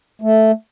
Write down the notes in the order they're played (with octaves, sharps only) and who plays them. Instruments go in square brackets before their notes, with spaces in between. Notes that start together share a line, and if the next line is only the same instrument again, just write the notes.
[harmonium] A3